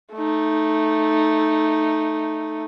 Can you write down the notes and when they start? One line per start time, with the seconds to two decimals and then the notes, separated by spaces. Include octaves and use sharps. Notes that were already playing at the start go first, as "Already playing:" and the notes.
0.13 A3 D#4